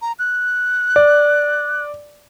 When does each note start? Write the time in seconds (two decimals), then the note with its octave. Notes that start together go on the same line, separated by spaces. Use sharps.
0.02 A#5
0.19 F#6
0.96 D5